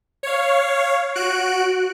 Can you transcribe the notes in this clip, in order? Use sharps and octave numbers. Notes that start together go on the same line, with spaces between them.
C#5 F5
F#4 F#6 D7